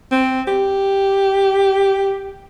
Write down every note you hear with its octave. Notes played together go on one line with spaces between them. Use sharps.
C4
G4